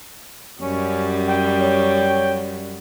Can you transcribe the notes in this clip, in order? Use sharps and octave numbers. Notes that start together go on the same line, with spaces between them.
F#2 G3 C#4
G5
C#5